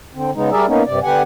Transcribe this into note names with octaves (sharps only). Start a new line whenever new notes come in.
D3 C4
C#3 G#3 B3 D#4
G3 G#4 A#4 D5 E5
A#3 B3 C#4 D#4
G2 C3 D5
D3 B3 G4 F#5 G#5